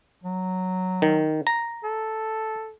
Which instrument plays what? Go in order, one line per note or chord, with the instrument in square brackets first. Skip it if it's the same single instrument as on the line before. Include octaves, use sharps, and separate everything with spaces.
[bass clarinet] F#3
[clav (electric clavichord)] D#3
A#5
[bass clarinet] A4